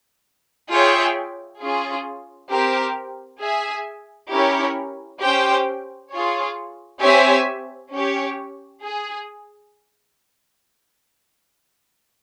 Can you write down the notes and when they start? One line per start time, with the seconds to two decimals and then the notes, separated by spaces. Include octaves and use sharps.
0.70 F4 G#4 C#5 E5 G5
1.61 C#4 F4 G#4
2.51 C4 G4 A#4
3.41 G#4 E5 G#5
4.32 C#4 E4 G4 A#4 C#5
5.21 C#4 G4 C5 G5
6.11 F4 G#4 C#5
7.02 C4 G4 C#5 E5 G#5
7.92 C#4 G4 C#5
8.82 G#4